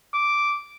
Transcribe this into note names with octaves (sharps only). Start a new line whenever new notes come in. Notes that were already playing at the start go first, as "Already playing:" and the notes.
D6